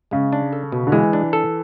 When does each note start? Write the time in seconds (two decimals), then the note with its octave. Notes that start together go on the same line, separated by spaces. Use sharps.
0.11 C#3 G#3
0.33 D4
0.53 A4
0.72 B2
0.87 D3
0.92 E3 G#3
1.13 D4
1.33 A4